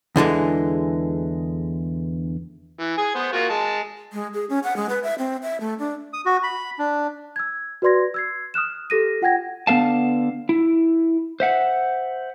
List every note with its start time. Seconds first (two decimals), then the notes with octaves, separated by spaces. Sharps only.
0.16 E2 D3 E3 G#3
2.79 E3
2.98 G#4 G#5
3.15 B3 C5
3.33 A#3 F4 F#4
3.50 G#3 A5
4.13 G#3
4.34 G#4
4.50 C#4
4.64 F#5
4.76 G#3
4.89 B4
5.04 E5
5.19 C4
5.43 E5
5.60 A3
5.79 D4
6.13 D#6
6.26 F#4
6.43 B5
6.79 D4
7.36 E6 G#6
7.82 F#4 B4 D5 C6 G#6 A#6
8.14 E6 G#6 C7
8.54 D#6 F6 F#6 E7
8.90 G4 A4 A#6 D#7
9.22 F4 F#5 G5 G#6 A#6
9.67 D3 B3 A#4 F5 A5
10.49 E4
11.40 C5 E5 F#5